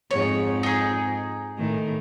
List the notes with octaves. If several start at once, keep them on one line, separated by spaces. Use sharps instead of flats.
F2 G#2 C#5
D#4 G#4
A2 D#3